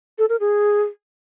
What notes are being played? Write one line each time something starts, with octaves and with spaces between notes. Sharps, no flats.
A4
A#4
G#4